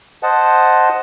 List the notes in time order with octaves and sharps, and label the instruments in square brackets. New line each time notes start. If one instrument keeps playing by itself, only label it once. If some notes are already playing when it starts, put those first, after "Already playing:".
[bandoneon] C5 D#5 F#5 A5